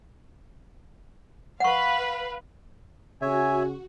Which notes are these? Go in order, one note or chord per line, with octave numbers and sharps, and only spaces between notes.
B4 F5 F#5 C#6
C#3 F#4 C#5 E5 G#5